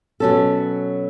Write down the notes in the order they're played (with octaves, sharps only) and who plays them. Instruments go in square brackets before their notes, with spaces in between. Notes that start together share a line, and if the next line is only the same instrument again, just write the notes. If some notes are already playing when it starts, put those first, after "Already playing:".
[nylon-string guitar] B2 F#3 C#4 A4